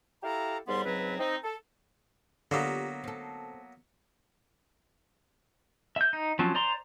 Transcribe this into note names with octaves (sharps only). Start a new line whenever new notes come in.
E4 G4 A4 F5 A#5
D#2 G#2 G3 B3 C6
C#2 G#2 F#3 C4 B4
C4 D#4
A4
D3 F#3 A#3 B3 F4 G4
C4 A4
E5 G6
D#4
F3 F#3 C4 C#4
C5 D5 A#5 C6